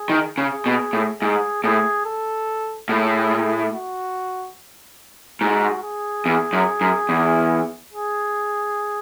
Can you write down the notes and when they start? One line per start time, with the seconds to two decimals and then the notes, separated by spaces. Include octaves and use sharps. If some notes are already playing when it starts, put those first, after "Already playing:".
Already playing: G#4
0.09 D#3
0.38 C#3 G#4
0.66 B2
0.93 A2
1.22 G#2 G#4
1.64 A2 G#4
2.05 A4
2.89 A2 G#4
3.73 F#4
5.41 G#2 F#4
5.83 G#4
6.26 E2
6.53 F#2
6.81 F#2
7.09 E2
7.93 G#4